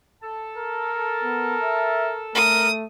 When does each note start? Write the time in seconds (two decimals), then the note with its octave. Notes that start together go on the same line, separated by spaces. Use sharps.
0.22 A4 A5
0.57 A#4
1.23 B3
1.63 E5
2.35 A3 A#4 D#6